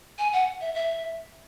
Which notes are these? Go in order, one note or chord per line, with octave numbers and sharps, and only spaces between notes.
G#5
F#5
E5
E5